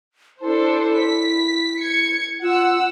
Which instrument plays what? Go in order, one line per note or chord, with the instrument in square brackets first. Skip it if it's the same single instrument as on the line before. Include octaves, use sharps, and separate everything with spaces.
[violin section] D4 A4 C5 [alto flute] E4
[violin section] B6
G#6 C#7
[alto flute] F4 [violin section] F#5 E6